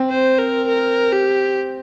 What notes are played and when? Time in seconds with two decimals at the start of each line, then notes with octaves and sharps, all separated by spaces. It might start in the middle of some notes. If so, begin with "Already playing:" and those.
Already playing: C4
0.10 C5
0.38 A#4
0.68 A#4
1.12 G4